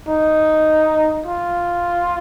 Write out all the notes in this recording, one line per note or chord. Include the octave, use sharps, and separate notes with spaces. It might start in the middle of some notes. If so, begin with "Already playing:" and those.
D#4
F4